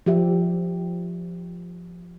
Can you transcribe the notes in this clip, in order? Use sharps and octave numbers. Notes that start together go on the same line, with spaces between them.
F3 G4 E5